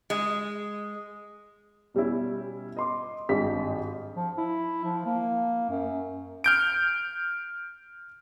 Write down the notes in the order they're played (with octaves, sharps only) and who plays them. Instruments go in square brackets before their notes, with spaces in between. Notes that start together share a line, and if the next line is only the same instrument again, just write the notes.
[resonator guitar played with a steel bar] G#3
[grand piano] B2 G3 C#4 E4
D#5 C6 D6
G#1 G2 D#5 B6
[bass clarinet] F3
E4
F3
A#3
F#2
[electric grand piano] F6 G6 D7